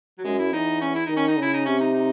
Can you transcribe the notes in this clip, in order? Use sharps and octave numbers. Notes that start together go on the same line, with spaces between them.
F#3
F#2 G#3
E4
E2 D#4
C#4
E4
D#3 D#4
C#4
D#4
C#3 E4
D#4
C3 C#4
D#4
D#4